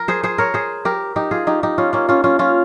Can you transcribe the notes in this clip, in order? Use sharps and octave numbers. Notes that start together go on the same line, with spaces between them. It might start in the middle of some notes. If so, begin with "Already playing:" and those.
Already playing: A#4
G#4 C5
G#4 C5
A#4 C#5
G#4 C5
G4 A#4
D#4 G4
F4 G#4
D#4 G4
D#4 G4
C#4 F4
A#3 C#4
C#4 F4
C#4 F4
C#4 F4